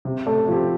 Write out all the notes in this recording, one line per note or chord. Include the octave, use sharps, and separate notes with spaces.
C3
A3
F3 C4 G4